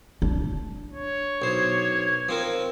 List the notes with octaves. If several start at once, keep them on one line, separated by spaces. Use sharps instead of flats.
D4
C#5
B1 C5 G#6
F3 C4 A#4